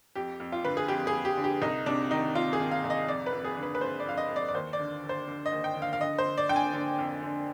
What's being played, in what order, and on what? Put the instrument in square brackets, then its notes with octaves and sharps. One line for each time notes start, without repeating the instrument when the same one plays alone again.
[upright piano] F2 G4
F2
F4
D3 B4
G#4
F2 G4
G#4
F2
G4
D3
G4
C2 D#4
C3 D4
D#3 D#4
C3 F4
G#4
D#3
F5
C2
D#5
F2 D5
B4
F2
G#4
D3
B4
B4
F2 C5
D5
F2 F5
D#5
F2
D5
D5
D#2 C5
D5
D3
D3
C5
D3
D#5
D#2
G5
D3
F5
F5
D3 D#5
C5
D3
D5
D3 G5
G#5
D3
F2
D3